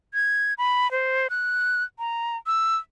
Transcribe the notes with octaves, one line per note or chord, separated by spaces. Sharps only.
G#6
B5
C5
F#6
A#5
E6